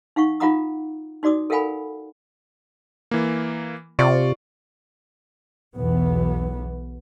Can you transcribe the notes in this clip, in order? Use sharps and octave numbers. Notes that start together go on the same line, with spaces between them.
D#4 F5 F#5 C#6
D#4 F4 F5 F#5 A#5 D#6
D#4 F#4 D5 D6 D#6
A4 A#4 F5 F#5 G#5 B5
E3 A#3
C3 F4 D5 C#6
B1 E2 E3 B3